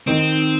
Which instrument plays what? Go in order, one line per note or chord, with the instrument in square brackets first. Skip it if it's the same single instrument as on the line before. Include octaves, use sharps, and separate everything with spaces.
[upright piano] D#3 D#4 [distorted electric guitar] C4